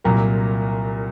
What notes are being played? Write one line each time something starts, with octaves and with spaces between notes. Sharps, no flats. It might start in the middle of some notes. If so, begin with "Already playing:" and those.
C2 A#2 F#3 A#3 A#5